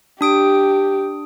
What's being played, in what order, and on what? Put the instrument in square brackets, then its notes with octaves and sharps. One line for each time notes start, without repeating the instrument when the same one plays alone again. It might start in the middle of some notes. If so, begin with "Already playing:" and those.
[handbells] D4 D#6 D7 [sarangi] G4